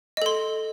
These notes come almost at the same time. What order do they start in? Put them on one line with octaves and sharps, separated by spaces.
D#5 A4 C6